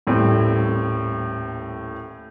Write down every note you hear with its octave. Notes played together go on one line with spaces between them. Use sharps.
D#1 A2 G3 C4